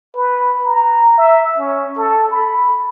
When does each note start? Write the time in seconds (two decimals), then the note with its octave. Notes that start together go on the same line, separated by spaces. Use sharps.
0.15 B4
0.64 A#5
1.18 E5
1.58 C#4
1.98 A4
2.32 B5